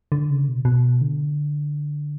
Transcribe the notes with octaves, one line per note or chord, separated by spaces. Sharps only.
D3
C#3
B2
B2
D3